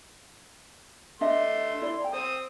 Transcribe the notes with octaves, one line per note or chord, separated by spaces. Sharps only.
A3 D4 D#5 E5 C6
E4 D5
G5 A#5
C4 C5 D#6